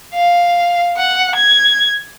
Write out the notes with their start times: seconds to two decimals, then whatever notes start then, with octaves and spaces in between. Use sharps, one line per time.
0.15 F5
0.97 F#5
1.35 G#6